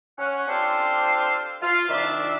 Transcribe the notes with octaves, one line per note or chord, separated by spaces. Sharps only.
C#4 F#5
C4 D4 F4 G4 A4 C5
F4
C2 D#3 D4 D5 E5